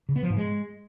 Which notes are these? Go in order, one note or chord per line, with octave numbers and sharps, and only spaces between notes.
C#3
B3
F3
G#2
G#3